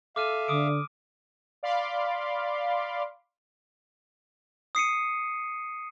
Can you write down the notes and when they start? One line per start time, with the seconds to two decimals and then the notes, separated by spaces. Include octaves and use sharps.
0.16 A4 E5 F5 D6 F6 D#7
0.48 D3 D6 D#6 D7
1.63 D5 F5 B5 C6 D6
4.75 D#6 C7 C#7 D#7